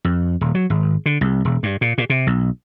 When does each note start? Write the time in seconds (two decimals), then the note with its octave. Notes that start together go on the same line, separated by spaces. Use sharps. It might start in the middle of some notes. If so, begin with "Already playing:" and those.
0.05 F2
0.41 D#1
0.55 F#3
0.70 G#1
1.06 D3
1.21 C2
1.45 E1
1.63 G2
1.81 A#2
1.98 A#2
2.10 C3
2.27 B1